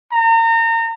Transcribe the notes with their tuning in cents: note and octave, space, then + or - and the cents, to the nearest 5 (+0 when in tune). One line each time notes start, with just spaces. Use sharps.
A#5 -35